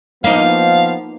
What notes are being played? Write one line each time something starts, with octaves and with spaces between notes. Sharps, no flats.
F3 A#3 B3 D#4 F5